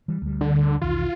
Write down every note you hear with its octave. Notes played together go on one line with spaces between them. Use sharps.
E3 G3
D2 G3
D3
B1 E2 D#3 F4